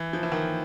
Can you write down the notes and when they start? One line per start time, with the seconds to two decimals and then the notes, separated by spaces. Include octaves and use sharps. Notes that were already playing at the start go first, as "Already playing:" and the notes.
Already playing: E3
0.13 F3
0.23 E3
0.32 D#3